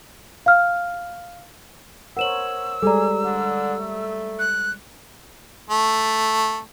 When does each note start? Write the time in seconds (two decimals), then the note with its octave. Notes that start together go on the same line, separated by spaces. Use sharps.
0.46 F5 F6
2.17 A#4 C5 C#5 F#5 E6 E7 F#7
2.83 G3 G#3 G#4 A4 D5 A#5
3.24 D3
3.78 A3
4.39 F#6
5.70 A3